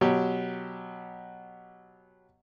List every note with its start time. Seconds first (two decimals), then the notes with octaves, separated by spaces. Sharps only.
0.01 B2 F#3 G4